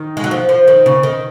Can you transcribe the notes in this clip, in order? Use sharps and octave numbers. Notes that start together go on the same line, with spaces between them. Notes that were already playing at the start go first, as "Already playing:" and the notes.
Already playing: D#3
G#3
F#3
F3
F3
D#3
C#3
D#3